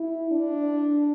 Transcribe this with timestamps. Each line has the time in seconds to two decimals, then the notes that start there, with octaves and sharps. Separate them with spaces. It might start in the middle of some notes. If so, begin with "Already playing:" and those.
Already playing: E4
0.31 D4